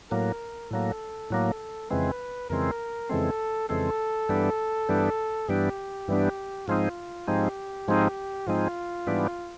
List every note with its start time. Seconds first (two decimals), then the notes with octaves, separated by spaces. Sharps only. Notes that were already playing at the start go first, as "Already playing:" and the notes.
0.11 A2 F#3 A#3 A#4
0.71 A2 F#3 A#3 A4
1.30 A2 F#3 A#3
1.90 F2 C#3 E3 G#3 C4 B4
2.50 F2 C#3 E3 G#3 C4 A#4
3.09 F2 C#3 E3 G#3 C4 A4
3.69 F2 C#3 E3 G#3 C4 A4
4.29 G2 E3 G3 B3 D4
4.89 G2 E3 G3 B3 D4
5.48 G2 E3 G3 B3 D4 G4
6.08 G2 E3 G3 B3 D4
6.67 G#2 F3 G#3 C4 D#4 F4
7.27 G#2 F3 G#3 C4 D#4 G4
7.88 G#2 F3 G#3 C4 D#4
8.47 G#2 F3 G#3 C4 D#4 F4
9.07 G#2 E3 G3 B3 D4